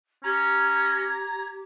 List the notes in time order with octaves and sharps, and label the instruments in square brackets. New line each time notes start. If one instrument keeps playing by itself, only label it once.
[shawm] C#4 [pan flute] G4 [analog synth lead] A#5 [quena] G#6